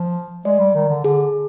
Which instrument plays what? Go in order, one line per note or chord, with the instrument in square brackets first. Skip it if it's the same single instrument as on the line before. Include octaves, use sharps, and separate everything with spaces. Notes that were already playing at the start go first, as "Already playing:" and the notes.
Already playing: [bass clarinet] F3
[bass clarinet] G#3 [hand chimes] D5
[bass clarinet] G3
D#3
D3
[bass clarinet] D3 [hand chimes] G#4